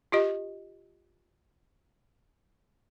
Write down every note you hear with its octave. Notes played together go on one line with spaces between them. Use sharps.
F4 G4 D#5